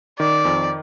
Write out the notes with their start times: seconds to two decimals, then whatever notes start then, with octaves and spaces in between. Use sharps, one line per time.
0.19 D#3 D5
0.45 F2